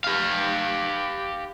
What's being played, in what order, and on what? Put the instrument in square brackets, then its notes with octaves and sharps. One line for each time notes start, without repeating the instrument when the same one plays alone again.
[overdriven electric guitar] G4 F5